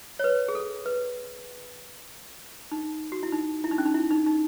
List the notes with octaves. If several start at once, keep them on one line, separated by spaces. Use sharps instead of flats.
C#5
B4
G#4
A4
B4
D#4
F#4
E4
D#4
E4
D#4
C#4
D#4
E4
D#4
D#4